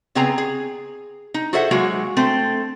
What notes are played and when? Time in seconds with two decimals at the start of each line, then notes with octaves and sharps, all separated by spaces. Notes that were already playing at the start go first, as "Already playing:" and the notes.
0.15 C#3 B3 C4 G#4 G#5 A#5
0.38 G#4
1.34 D#4
1.53 F#4 G#4 A4 C5 E5 F#5
1.71 F#3 G#3 A#3 F#4
2.17 A3 C4 A4